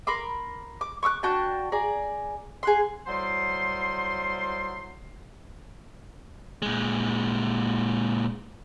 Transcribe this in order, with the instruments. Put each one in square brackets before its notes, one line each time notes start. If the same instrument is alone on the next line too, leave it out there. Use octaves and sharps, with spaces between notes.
[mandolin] A#4 B5 C6 D6
D6
C#6 D6 E6 F#6
D4 F#4 G5 A5
G#4 D5 A#5
G#4 F#5 C6
[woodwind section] A2 F#3 G3 C5 C6
[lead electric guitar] A#2 G#3